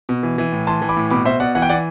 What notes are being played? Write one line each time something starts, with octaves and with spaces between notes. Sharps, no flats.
B2
E3
E3
A2
E3 A5 C6
E3
B5 D6
A2
B2 B5 D6
B2 C5 E5
B2 D5 F#5
E3 F#5
G5
E3 D5 F#5